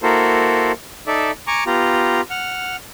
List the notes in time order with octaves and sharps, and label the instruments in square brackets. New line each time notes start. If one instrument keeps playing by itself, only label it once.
[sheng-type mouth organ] A#3 E4 F#4 A4 A#4 C5
D#4 A4 D5 E5
G#5 A#5 C#6 D6
B3 F4 G4 A#5
F#5 F6